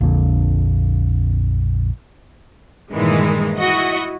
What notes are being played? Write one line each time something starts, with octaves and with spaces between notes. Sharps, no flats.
A#1 F2 A#2 D3
G2 A#2 D#3 E3 G#3
E4 F#4 D#5